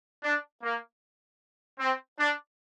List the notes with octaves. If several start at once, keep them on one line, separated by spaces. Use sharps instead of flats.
D4
A#3
C4
D4